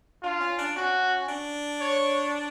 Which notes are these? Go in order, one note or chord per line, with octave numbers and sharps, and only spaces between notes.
D4 F4
C#4
D4
C#4 F#4
D4
C#5